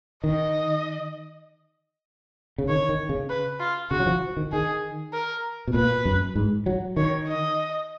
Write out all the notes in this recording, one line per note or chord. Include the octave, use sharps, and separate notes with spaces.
D#3 D#5
C#3
D#3 C#5
D#3
C#3
B4
F4
C#3 F#4
F#3
F3
D#3
D#3 G#4
A#4
B2
A#2 B4
F#2
G#2
F#3
D#3 C#5
D#5